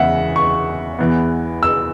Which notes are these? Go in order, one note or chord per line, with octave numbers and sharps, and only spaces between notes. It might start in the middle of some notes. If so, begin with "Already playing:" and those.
Already playing: E2 C#3 E3 G#3 E5 F#5
C#6
E2 E3 B3
E6